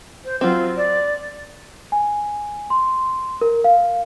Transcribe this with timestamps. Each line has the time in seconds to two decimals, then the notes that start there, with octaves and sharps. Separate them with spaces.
0.24 C5
0.41 F#3 C4 F4
0.76 D5
1.92 G#5
2.70 C6
3.41 A#4
3.64 F5